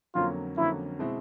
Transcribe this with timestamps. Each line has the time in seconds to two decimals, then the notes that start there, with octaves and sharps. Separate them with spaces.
0.15 F2 D3 F#3 A#3 C#4 F4
0.57 F2 D3 F#3 A#3 C#4 E4
0.99 B2 G#3 C4 E4